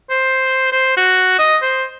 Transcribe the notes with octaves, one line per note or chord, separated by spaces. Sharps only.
C5
C5
F#4
D#5
C5